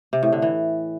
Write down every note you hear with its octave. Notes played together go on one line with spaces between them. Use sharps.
C3
A2
D3
E3